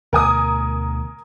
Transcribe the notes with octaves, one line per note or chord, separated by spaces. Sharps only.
D2 B2 D3 A#4 G#5 D#6